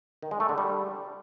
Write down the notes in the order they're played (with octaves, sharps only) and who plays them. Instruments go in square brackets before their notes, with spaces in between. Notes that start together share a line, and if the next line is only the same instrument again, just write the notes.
[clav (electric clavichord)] D#3
G#3
A3
D3
G3